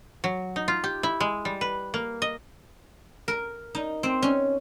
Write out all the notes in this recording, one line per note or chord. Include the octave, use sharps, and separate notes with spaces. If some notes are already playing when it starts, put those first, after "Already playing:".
F#3
D#4
F4
G4
E4
G#3
G3
B4
A#3
D#5
A#4
D#4
C4
C#4